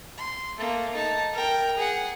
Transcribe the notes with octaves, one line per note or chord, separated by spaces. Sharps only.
C6
A3 A#3
D#4 A5
A#4 G5
G#4 F#5